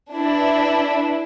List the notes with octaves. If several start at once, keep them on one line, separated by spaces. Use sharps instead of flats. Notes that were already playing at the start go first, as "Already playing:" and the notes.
D4 E4 B4